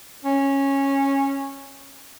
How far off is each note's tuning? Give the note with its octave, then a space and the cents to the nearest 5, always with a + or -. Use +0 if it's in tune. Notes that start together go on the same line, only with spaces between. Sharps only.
C#4 -10